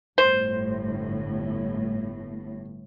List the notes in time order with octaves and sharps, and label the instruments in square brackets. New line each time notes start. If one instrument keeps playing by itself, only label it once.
[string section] G1 A2 [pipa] C5